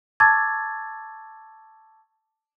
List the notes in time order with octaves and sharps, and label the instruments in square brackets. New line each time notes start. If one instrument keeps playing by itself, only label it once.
[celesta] A5 C#6 D6 E6 G#6 A6